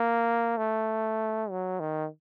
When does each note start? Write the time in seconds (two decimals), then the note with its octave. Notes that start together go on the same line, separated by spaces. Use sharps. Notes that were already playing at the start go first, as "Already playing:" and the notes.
Already playing: A#3
0.58 A3
1.50 F#3
1.80 D#3